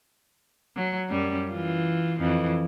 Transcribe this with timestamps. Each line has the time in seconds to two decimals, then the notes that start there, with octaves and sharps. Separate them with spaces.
0.76 F#3
1.10 F#2 G3 C#4
1.50 E3 F4
2.20 F2 E3 F3